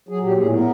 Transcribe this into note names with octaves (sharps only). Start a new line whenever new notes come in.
F#3 G#4
A#2 G4
A2 G#4
B3 A#4